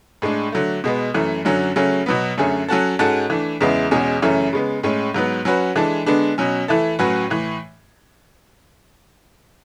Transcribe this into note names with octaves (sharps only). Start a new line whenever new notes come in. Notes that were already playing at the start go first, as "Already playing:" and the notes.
A2 G#3 D4
D3 F#3 A3
B2 G#3 B3
F#2 E3 A3
F#2 D3 F#3 C#4
C#3 F#3 A3 C#4
B2 F#3 B3
F#2 D3 A3 C#4 G#4
F#3 C#4 F#4 A4
G#2 G#3 C#4 F#4 A4
E3 A3 D4
E2 C#3 G#3 B3 E4
E2 B2 G#3 C#4
F#2 C#3 E3 A3 C#4
C#3 G#3 B3
A2 G#3 C#4
G#2 F#3 B3
F#3 C#4 F#4 B4
E3 G#3 D4 A4
D3 G#3 B3 D4
B2 F#3 C#4
E3 A3 E4 A4
A2 F#3 C#4 F#4 B4
A2 E3